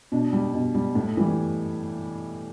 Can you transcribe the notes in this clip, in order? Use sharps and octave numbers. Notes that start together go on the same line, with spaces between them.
B2 D4
G3
B2
G3
A2
E3 G3